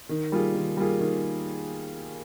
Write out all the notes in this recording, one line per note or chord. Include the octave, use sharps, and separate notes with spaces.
D#3
G3 A#3 F4 G#4
D#3
G3 A#3 F4 G#4
D#3